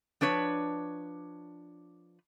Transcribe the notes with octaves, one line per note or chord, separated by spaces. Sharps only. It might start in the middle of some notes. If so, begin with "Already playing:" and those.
F3 D4 B4 C#5